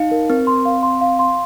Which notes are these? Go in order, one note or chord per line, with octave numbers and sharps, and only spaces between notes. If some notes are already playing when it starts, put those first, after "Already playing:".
Already playing: D#4 F5
A#4
C4 A#4
C6
F5
C6
F5
C6